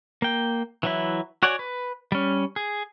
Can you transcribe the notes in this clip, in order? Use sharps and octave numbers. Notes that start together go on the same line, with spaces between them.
A#3 G5
E3 F#3 E4
F#4 C#5 D5 F#5 G#5
B4
G3 C#4
G#4